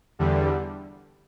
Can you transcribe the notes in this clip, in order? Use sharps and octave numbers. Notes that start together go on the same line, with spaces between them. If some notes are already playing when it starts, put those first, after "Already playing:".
E2 D3 G3